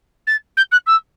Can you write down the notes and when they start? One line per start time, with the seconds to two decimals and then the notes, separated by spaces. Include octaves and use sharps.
0.27 A6
0.57 G6
0.71 F#6
0.86 E6